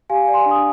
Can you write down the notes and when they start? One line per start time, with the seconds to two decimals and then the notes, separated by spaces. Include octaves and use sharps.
0.10 G4 F5 G#5
0.28 D5
0.34 G#5 C6
0.46 D4
0.51 D#6